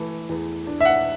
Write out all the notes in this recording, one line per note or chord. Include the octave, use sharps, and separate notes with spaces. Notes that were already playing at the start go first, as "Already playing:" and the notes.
Already playing: E3 A3
E2
D4
E5
F#5